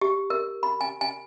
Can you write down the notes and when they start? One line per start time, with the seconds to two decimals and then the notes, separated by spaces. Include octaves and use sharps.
0.01 G4
0.30 A#4
0.63 B5
0.81 G#5
1.01 G#5